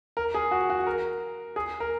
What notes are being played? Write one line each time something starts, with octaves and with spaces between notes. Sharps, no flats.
A#4
G#4
F#4
F#4
A#4
G#4
A#4